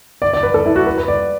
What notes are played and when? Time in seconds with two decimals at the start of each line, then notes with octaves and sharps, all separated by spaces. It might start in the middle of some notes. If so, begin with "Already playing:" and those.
0.22 D5
0.33 D5
0.43 B4
0.54 A4
0.66 E4
0.76 F#4
0.86 B4
0.98 B4
1.08 D5